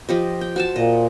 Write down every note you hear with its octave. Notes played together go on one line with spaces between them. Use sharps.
F3 G4 D#5
G5
F#4 C5 A5
A#2 D#5